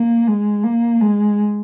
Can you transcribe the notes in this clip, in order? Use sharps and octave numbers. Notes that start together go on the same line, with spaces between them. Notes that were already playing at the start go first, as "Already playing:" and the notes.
Already playing: A#3
G#3
A#3
G#3